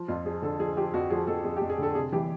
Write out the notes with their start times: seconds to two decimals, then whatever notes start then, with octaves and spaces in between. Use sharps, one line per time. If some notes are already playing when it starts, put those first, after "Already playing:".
Already playing: F3
0.08 F2 F4
0.25 F3 G#4
0.42 D3 A4
0.60 F3 G#4
0.77 F3 G4
0.94 F2 F#4
1.10 F3 G#4
1.27 F2 A4
1.44 F2 G#4
1.57 G4
1.62 F2
1.70 G#4
1.78 D3 A4
1.95 C3 G#4
2.12 E3 G4